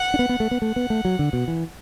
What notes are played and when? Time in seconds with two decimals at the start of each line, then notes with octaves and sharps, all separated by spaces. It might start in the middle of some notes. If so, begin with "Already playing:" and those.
Already playing: F#5
0.14 D4
0.19 B3
0.29 B3
0.40 A3
0.51 B3
0.61 A3 F#5
0.76 B3
0.90 A3
1.05 F#3
1.19 D3
1.33 B2
1.48 E3